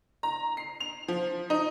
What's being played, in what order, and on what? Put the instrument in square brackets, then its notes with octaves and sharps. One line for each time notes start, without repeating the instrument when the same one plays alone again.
[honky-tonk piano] A#5
C7
F7
F3
D#4